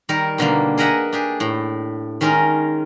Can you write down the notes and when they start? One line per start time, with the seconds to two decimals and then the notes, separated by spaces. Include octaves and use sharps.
0.09 D#3 G3 G4 A#4
0.38 B2 D3 G3 A#3
0.78 G#4 A#4 D#5 E5 F#5
1.13 D4 G4 G#4
1.40 A2
2.21 D#3 G#3 C#4 D#4 A#4